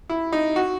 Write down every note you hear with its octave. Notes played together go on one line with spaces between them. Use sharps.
E4
D#4
F#4